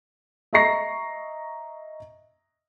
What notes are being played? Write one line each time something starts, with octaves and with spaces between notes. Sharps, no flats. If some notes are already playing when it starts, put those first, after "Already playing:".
D#5 E5 A#5 C#6 A#6 C7